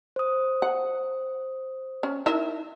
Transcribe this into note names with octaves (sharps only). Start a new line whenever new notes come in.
C5 D#6
F#5
C#4
D#4 E4 A#4 E5